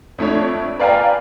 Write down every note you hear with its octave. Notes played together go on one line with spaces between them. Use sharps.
F2 A3 D4 C#5
B4 D5 F5 G5 G#5 A#5